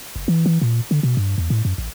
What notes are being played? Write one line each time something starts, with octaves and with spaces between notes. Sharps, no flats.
F#1
E3
E3
A#2
D3
B2
G2
E2
A2
F#2
A1